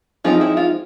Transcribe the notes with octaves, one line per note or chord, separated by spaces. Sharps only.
F3 G#3 C4 D#4 F4
E4
F4